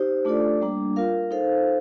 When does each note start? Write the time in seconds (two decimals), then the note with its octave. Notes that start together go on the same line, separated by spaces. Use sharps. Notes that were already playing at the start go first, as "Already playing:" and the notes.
Already playing: D#4 G4 C5
0.25 A3 D4 F4 A4 D5
0.61 G3 A#3 D4
0.96 F4 A#4 F5
1.31 D#4 A4 C5 F5